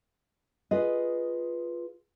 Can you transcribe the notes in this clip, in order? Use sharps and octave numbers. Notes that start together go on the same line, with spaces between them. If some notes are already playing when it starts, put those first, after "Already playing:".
F4 G#4 B4 D#5